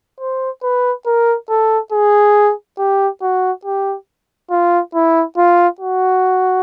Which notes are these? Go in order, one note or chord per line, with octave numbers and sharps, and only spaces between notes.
C5
B4
A#4
A4
G#4
G4
F#4
G4
F4
E4
F4
F#4